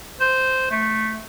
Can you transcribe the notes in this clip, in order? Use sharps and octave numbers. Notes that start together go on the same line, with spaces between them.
C5
A3